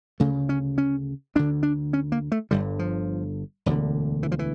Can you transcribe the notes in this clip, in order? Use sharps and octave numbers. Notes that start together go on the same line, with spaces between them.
D2 C#3 A3
C#4
C#4
D2 D3 D4
D4
C#4
A#3
A3
G1 G2 D3 G3
F3
E1 D2 D3
E3
F3
E3